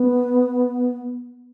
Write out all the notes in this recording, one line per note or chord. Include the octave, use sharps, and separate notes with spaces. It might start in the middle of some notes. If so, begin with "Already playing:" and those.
Already playing: B3